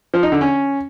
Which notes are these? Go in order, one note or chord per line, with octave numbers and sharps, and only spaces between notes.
F3
D#4
D3
C#4